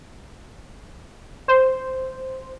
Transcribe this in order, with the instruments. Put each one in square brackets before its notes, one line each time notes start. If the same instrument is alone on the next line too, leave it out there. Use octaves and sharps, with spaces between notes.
[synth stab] C5